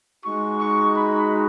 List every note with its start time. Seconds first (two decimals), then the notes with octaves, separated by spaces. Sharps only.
0.25 G#3 D#4 F#4 C#6
0.60 C#6
0.96 B5